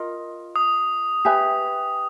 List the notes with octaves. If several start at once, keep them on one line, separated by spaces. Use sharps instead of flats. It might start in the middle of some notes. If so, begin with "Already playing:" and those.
Already playing: F4 A#4 D#5
D#6
G4 B4 E5 G#5